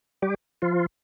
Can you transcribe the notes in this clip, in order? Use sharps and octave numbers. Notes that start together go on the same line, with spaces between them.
G3 G4
F3 F4